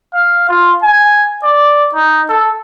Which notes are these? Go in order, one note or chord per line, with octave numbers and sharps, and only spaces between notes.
F5
F4
G#5
D5
D#4
A4